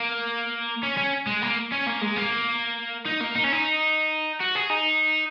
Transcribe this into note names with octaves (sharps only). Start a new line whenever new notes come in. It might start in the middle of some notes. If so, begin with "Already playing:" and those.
Already playing: A#3
C#4
C#4
G#3
A#3
C#4
A#3
G#3
A#3
D#4
A#3
D#4
C#4
D#4
F#4
G#4
D#4